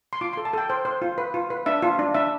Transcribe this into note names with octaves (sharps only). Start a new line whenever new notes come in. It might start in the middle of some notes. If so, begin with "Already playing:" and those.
C6
F4 D6
A4 C6
A5
A4 G5
C5 G5
C5
F4
B4
F4
B4
D4 E5
F4
D4
D4 E5